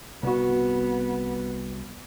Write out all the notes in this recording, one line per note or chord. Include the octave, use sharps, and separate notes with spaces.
C2 B3 F#4